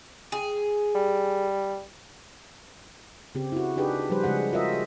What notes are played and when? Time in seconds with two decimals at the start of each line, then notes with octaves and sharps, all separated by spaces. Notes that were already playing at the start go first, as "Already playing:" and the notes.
0.32 G#4
0.95 G3
3.35 C#3 C4 G4
3.52 E4 F#4
3.76 D4 D#4 G4 G#4 B4
4.10 F3 G3 B4 C5
4.24 C#3 G#3 G#4 F#5
4.53 F4 F#4 A#4 C5 D#5 E5